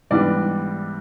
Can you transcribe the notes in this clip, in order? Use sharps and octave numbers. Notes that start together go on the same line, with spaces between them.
G#2 E3 G3 B3 D4 D5